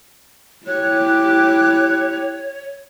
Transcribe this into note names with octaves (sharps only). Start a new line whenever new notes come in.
E4 G4 C#5 F#6